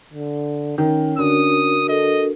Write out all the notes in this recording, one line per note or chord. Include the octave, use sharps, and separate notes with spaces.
D3
D#3 C#4
D3 D4 F#4 A#4 D#6
A4 D#5